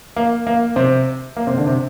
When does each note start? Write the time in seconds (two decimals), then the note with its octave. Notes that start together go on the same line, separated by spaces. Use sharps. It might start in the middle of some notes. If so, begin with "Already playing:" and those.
0.16 A#3
0.47 A#3
0.76 C3 C4
1.37 A#3
1.47 C3 C4
1.57 D3 D4
1.67 C3 C4